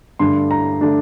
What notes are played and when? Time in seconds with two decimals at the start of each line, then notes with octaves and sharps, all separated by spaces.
0.19 G2 D3 A3 D4 C6
0.51 A#5
0.81 D3 A3 D4